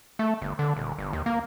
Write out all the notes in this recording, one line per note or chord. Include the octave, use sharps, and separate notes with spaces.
A3
G1
D3
D#1
G1
D#2
A#3